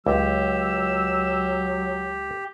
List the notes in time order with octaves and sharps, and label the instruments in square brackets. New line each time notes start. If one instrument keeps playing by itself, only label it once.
[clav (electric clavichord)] C#2 [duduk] F#3 [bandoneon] G4 [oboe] E6